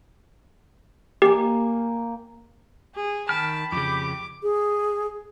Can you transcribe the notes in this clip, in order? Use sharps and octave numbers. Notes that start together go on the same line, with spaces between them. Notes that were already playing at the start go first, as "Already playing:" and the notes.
A#3 G4 G5 G#5
G#4
D#3 G5 A5 B5 F6
F2 C#3 G4 D6
G#4